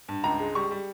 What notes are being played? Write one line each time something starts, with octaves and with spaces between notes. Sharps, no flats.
G2
C#2 A#5
G#3
G3 C#6
G3